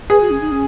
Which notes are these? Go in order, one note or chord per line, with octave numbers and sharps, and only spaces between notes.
G#4 B4
F#4
C#4
D#4
C#4